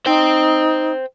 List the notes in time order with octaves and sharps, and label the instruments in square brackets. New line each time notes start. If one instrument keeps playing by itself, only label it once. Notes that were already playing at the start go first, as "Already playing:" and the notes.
[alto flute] D#4 [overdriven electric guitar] C5 G5